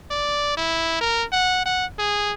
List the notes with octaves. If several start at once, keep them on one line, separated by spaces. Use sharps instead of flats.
D5
E4
A#4
F#5
F#5
G#4